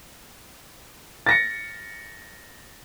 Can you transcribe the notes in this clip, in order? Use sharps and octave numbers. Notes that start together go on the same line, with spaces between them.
A6 A#6 C#7